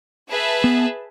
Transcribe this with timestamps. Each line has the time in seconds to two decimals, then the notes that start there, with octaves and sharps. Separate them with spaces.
0.29 G#4 B4 E5 A5
0.64 B3